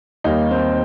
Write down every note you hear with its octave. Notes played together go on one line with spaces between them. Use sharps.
D#2 D#3 G3 A#3 D#4
C4